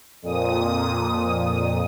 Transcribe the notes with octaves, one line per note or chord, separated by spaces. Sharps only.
F2 A#2 D#6